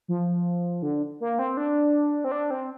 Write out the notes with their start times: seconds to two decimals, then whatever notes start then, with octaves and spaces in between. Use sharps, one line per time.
0.08 F3
0.83 D3
1.20 A#3
1.39 C4
1.57 D4
2.24 C4
2.32 D4
2.50 C4